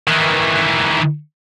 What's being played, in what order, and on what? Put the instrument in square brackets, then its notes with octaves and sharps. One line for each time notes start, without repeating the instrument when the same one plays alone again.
[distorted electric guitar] D#3 E3